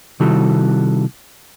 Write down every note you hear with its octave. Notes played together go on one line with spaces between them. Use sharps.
C3 D#3 G3 E4 F#4 A4